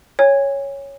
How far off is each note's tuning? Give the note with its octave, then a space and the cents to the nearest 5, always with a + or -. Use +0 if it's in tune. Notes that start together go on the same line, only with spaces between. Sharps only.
C#5 +0 G#5 -30